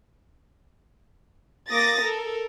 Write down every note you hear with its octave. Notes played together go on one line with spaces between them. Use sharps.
A#3 D6 D#6 A6 A#6
A4 A#4